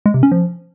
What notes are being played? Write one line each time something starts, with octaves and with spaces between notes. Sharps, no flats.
G#3
C3
C#4
F3